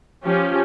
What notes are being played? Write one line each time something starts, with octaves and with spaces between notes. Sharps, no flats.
F3 C#4 G4